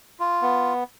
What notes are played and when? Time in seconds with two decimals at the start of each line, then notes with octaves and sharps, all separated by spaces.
0.20 F4
0.42 B3